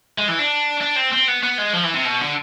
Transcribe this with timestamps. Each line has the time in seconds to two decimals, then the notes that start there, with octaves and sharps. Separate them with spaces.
0.18 G#3
0.28 E3
0.39 D4
0.80 D4
0.96 C4
1.12 C4
1.28 B3
1.43 B3
1.58 G#3
1.74 F3
1.84 E3
1.94 C3
2.05 B2
2.21 D3